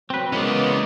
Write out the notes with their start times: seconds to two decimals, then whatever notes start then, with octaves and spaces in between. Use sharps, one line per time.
0.10 F#3 C4 B4
0.33 E3 G#3 A#3 B3 C#4 D5 D#5